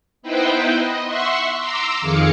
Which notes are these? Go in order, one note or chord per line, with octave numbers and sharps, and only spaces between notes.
B3 D#4 E4 B4 C5 G5
D#5
E5 F#5 C6 C#6
A#5 C6 D6 E6
F2 D#3 G#4 F5 D6 C#7